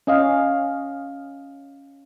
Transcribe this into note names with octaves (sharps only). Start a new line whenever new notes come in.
C#4 D#5 F5